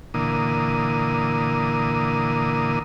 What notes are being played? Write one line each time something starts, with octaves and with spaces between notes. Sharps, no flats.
A#2 D3 E3 A#3 D#6